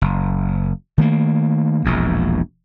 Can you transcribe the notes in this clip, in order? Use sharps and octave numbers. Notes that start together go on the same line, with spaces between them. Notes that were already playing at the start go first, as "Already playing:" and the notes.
F#1
D#3 A3 A#3
E1 A#1 E2